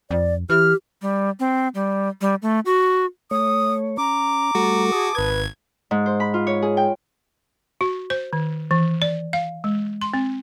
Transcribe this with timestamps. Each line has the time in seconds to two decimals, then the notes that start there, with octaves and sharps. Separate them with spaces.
0.11 F2 D5
0.50 E3 G4 F6
1.02 G3
1.40 C4
1.75 G3
2.21 G3
2.42 A3
2.66 F#4
3.31 A3 C#5 D#6
3.98 C#4 A#5 D6
4.55 G3 A3 F#4 A4
4.92 G#4 A5 D#6
5.15 G#1 B4 G#6
5.91 G#2
6.06 C5
6.20 B5
6.34 F4
6.47 C#5
6.62 G#4
6.77 G5
7.81 F#4
8.10 C5
8.33 D#3
8.71 E3
9.02 D5
9.33 F5
9.64 G#3
10.02 C6
10.14 C4